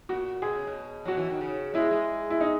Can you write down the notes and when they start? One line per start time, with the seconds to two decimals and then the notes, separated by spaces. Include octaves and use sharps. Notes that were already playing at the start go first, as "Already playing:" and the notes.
0.09 A#2 F#4
0.42 B2 G#4
0.55 C#3
0.67 B2
1.05 F#3 F#4
1.17 E3
1.30 D#3
1.41 C#3
1.74 G#3 E4
1.91 G#3
2.30 E4
2.40 D#4